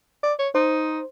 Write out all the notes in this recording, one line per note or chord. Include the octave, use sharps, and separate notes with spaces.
D5
C#5
D#4 C5